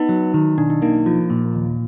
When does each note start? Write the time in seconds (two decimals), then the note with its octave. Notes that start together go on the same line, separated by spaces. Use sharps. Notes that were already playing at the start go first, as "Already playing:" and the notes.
Already playing: B3 D#4
0.09 F#3
0.34 D#3
0.58 B1 D4
0.70 D#4
0.82 A#3 D#4
1.06 F3 F4
1.30 A#2
1.55 D#2